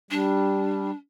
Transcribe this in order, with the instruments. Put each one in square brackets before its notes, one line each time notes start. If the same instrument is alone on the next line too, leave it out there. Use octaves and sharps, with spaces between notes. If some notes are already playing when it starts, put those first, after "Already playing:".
[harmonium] G3 [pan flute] D4